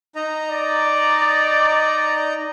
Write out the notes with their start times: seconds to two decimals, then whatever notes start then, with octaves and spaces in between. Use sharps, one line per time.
0.15 D#4 D#5 A#5
0.50 D5